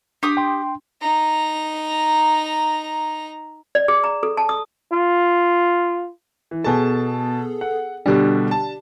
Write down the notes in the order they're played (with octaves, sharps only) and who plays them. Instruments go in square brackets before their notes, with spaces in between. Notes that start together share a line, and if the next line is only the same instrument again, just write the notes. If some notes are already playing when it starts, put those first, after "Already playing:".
[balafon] D4 [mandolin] G4 D6 D#6
[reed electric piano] G5 C6
[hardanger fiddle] D#4 A#5
[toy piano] D5
G#4
A#5
A4
A5
D#6
[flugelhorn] F4
[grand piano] E3
[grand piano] B2 A5 [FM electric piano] B3 G#4 A4
[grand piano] F#5
[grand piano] B2 D3 G3 [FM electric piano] D4 G4
[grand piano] A5